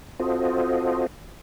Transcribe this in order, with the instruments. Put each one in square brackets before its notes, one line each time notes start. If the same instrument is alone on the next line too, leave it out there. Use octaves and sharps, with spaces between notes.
[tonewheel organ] C4 F4 F#4 A4 C5 D#5